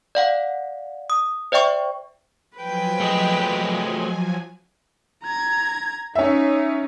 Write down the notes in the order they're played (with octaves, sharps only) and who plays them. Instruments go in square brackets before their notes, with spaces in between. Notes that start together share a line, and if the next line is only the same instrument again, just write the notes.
[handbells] D5 F5 F#5
D#6
C5 D5 E5 G5 C#6
[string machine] F3 F#3 G#5 [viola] B4 G5
[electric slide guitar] A3 G#4 D#5
[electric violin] A#5 G#6
[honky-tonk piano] C#4 E5 [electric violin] D#4